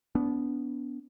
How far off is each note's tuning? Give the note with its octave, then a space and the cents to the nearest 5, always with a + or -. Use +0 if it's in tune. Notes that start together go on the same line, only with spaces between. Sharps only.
B3 +0 D4 -35